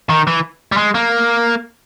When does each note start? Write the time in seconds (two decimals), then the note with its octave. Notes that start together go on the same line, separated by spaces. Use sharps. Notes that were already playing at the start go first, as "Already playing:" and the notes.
0.09 D#3
0.27 E3
0.72 G3
0.77 G#3
0.95 A#3